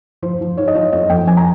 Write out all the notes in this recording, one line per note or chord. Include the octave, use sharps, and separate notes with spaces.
F3 C5
F3
G#2 C#5
D#5
F3 C#5
F2 D#5
F2 G5
F2 G#5
A#5